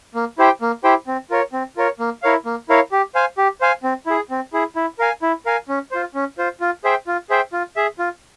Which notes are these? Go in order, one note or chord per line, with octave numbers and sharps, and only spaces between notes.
A#3
E4 G4 C5 G5
A#3
E4 G4 C5 G5
C4
F4 A#4 C#5
C4
F4 A#4 C#5
A#3
E4 A#4 C#5 F5
A#3
E4 A#4 C#5 F5
G4
C5 F5 G#5
G4
C5 F5 G#5
C4
E4 G#4
C4
E4 G#4
E4
A#4 F5 G#5
E4
A#4 F5 G#5
C#4
F4 C5
C#4
F4 C5
F4
G#4 C5 E5 G5
F4
G#4 C5 E5 G5
F4
G#4 E5
F4